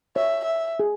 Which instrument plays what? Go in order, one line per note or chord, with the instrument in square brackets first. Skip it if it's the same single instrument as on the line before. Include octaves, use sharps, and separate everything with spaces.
[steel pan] C#5 [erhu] E5
[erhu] E5
[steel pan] G#4